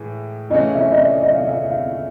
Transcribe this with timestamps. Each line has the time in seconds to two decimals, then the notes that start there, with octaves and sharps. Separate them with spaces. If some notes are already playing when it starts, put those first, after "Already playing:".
Already playing: A2 E3 G#3
0.50 C#3 E3 A3 C#4 D#5
0.75 E5
0.92 D#5
0.98 D5
1.23 D#5
1.35 F5
1.47 E5
1.70 F5